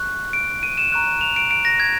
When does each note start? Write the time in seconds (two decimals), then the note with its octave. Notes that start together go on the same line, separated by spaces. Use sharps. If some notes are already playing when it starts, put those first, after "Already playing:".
Already playing: C#6 F#6
0.33 D7
0.63 D#7
0.78 E7
0.92 A#5 C#6 F#6
1.21 F7
1.36 D7
1.51 D7
1.65 A#6
1.80 G#6